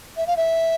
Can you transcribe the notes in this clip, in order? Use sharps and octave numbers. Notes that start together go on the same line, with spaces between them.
E5
F5
E5